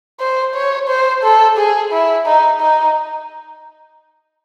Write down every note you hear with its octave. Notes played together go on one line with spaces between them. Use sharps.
C5
C#5
C5
A4
G#4
E4
D#4
D#4